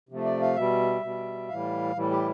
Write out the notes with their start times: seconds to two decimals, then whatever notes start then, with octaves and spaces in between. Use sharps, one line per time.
0.09 C3 F3 A3
0.25 D5
0.41 F5
0.56 B2 G3 E5
1.03 B2 G3
1.49 A2 E3 G3 F5
1.95 A2 E3 G3
2.11 G4